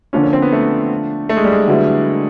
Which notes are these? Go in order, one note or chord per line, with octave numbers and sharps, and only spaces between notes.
D3 F3 A#3 C#4 D4 F4
C#4
C4
B3
A3
A3
G#3
G3
G#3
D3 F#3 B3 E4